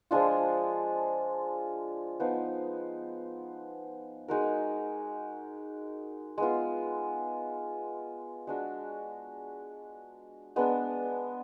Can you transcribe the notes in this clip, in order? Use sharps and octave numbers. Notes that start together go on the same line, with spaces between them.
F3 G#3 D4 F4
F3 B3 D#4
G#3 D#4 F#4 A#4
G#3 B3 F4
G#3 D4 F#4
G#3 B3 D4